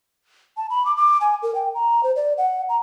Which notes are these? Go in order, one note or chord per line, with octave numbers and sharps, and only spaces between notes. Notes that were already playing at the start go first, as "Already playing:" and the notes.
A5
B5
D6
D6
G#5
A#4
G5
A#5
C5
D5
F#5
A#5